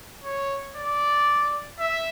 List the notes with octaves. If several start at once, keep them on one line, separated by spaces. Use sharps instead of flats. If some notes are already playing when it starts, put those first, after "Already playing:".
C#5
D5
E5